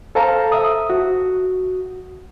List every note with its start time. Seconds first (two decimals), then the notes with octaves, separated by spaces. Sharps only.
0.15 A4 C5 F5 A5 A#5
0.52 E5 D#6
0.90 F#4